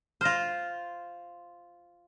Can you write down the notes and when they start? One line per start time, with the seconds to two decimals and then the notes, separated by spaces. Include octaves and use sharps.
0.21 F4 C5 F6 A#6